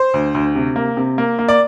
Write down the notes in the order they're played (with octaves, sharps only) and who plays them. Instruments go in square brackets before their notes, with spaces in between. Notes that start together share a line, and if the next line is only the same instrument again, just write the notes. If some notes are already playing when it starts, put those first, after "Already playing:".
Already playing: [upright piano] C5
D2
D2
C3
A#3
C3
A#3
A#3
D5